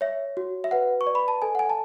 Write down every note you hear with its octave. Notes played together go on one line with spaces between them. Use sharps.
C#5 E5
F#4
E5
B4 F#5
C#6
D5
B5
A5
A4 G#5
F#5
G#5
A5